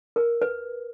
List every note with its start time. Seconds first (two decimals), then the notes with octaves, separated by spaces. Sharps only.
0.16 A#4
0.42 B4